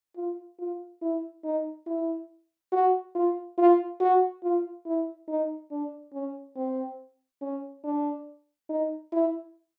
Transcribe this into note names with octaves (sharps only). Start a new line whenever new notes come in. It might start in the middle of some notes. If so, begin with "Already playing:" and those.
F4
F4
E4
D#4
E4
F#4
F4
F4
F#4
F4
E4
D#4
D4
C#4
C4
C#4
D4
D#4
E4